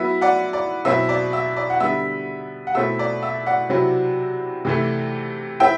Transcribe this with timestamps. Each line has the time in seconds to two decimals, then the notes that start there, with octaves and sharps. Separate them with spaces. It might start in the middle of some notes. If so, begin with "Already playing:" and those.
Already playing: F#3 B3 E4 E5
0.21 D5 F#5
0.53 D5
0.85 B2 F#3 C4 E4 E5
1.09 D5
1.33 E5
1.57 D5
1.70 F#5
1.80 D3 G3 B3 E5
2.67 F#5
2.75 B2 A3 C4 E4 E5
2.99 D5
3.23 E5
3.46 D5 F#5
3.69 C3 F#3 C4 E4
4.65 C3 E3 A3
5.60 C4 E4 E5 G5